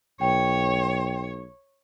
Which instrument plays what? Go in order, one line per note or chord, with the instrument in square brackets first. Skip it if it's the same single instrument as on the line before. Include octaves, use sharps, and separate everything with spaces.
[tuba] B1 [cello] C#5 [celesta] G5